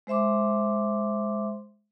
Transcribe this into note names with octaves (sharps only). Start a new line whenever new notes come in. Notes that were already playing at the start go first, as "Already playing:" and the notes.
G#3 C5 E5 C6 D6